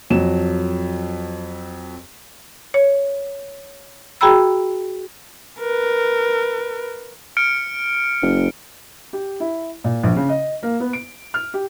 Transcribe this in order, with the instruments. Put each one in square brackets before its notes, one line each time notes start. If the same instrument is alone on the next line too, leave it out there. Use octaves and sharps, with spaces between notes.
[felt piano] F2 F#3 E7
[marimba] C#5
F#4 G#4 G5 A#5 B5 E6
[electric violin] A#4 B4
[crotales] F6 C#7 D7
[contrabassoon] F#1
[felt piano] G4
E4
A#2
A#1
C#3
D#5
A#3
B3
D7
F6
G4